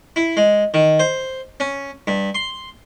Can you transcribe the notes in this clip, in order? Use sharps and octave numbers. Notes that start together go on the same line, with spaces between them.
E4
G#3
D#3
C5
C#4
G2
C6